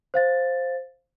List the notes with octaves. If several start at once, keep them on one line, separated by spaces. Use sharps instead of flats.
C5 F5 A6